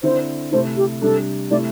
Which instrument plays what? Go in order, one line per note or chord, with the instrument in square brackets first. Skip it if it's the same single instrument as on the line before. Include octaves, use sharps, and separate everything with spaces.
[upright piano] D3 C4 E4 [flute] C5
[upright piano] C3 A3 E4 [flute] C5
[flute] G4
[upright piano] C3 G3 D4 [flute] A4
[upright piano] C3 A3 E4 [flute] D5